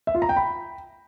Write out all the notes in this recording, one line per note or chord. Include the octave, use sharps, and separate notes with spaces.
E5
F4
A#5
G5
B5